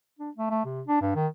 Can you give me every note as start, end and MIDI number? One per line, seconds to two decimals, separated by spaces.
0.19 0.30 62
0.37 0.50 57
0.50 0.64 57
0.65 0.82 48
0.87 0.98 62
1.01 1.12 43
1.15 1.27 51